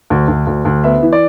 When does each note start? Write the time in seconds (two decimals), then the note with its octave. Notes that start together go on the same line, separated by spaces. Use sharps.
0.10 D2
0.28 D2
0.47 D2
0.65 D2
0.84 B3 E5
1.02 E3
1.12 D5